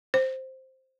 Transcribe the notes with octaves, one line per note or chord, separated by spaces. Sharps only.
C5